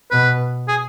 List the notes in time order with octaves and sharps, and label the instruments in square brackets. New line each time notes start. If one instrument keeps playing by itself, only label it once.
[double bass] B2 [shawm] B4
[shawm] G#4